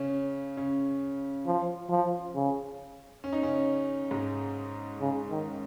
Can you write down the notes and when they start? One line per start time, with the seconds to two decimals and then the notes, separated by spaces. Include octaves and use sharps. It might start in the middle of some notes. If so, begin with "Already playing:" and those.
Already playing: C#3 C#4
0.57 C#3 C#4
1.46 F3
1.90 F3
2.35 C#3
3.24 C#4
3.33 D#4
3.43 C#3 C#4
4.11 G#2 G#3
5.01 C#3
5.30 D#3